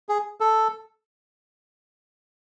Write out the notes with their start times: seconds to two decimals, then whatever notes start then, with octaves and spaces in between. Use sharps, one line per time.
0.09 G#4
0.40 A4